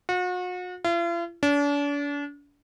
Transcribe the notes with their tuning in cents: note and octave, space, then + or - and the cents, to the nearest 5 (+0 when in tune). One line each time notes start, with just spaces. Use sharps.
F#4 -40
F4 -45
D4 -40